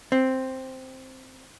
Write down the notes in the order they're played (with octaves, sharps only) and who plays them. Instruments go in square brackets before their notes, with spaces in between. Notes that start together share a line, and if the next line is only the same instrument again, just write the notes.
[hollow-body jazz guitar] C4